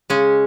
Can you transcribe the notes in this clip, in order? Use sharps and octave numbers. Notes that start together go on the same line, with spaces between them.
C#3 G#3 C#4